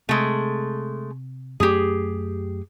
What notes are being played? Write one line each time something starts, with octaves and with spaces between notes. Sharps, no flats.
C3 G#3 A3
F#2 A3 G4 G#4